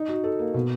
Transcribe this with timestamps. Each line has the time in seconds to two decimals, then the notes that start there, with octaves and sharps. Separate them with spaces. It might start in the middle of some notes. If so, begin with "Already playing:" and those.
Already playing: D#4
0.09 F#4
0.24 A4
0.39 A#3
0.54 B2